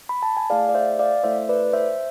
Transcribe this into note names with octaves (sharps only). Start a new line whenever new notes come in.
B5
A5
G#5
A3 E4 G#4 D5 F5
D5
C5 E5
D5 F5
A3 E4 A4 C5 E5
B4 D5
C5 E5